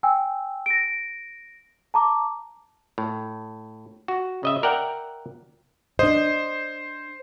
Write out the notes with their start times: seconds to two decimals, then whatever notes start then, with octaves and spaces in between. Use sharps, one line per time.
0.03 G5 G#5 E6
0.66 A#6 D7
1.94 A5 A#5 D6
2.98 A2
4.08 F#4
4.43 C#3 D#5 E5
4.63 A#4 D5 E5 F#5 G5
5.99 D4 C5 D#5